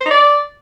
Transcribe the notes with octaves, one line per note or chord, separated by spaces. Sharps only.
C5
D#4
D5